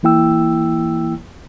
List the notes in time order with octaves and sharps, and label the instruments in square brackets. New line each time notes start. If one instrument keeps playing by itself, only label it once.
[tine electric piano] E3 A#3 E4 G5 E6